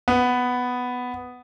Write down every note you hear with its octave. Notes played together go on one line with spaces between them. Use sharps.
B3